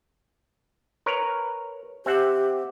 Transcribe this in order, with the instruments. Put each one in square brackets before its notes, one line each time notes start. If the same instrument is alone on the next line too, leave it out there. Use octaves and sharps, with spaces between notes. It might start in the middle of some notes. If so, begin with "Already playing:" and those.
[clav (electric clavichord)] A#4 B4 C#5
[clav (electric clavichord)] C4 E5 F#5 [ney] G4